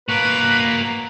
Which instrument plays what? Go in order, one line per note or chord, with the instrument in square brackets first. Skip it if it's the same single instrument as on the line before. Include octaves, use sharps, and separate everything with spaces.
[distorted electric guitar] A#3 F#4 [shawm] B4